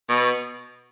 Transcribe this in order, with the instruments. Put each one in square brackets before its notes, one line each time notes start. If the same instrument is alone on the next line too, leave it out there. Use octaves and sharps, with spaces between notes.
[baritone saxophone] B2